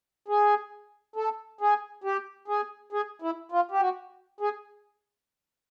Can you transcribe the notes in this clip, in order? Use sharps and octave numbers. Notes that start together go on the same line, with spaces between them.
G#4
A4
G#4
G4
G#4
G#4
E4
F4
G4
F#4
G#4